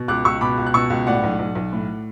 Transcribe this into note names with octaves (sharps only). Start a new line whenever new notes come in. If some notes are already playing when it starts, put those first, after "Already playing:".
Already playing: B2
C#2 D6 F#6
C#2 C#6 E6
B2 B5 D6
C#2
F#6
B2 C#6 E6
C#2
A2 D5 F#5
B1
B1
B1
A2